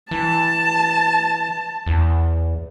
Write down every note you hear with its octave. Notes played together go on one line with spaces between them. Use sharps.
E3 A5
E2